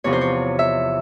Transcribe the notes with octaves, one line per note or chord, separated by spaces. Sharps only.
E2 C3 F3 C#5
C5
C#5
E5